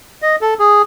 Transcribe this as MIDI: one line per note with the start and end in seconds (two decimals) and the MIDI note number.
0.22 0.36 75
0.41 0.54 69
0.59 0.82 68